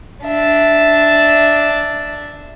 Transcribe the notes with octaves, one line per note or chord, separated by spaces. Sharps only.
D4 E5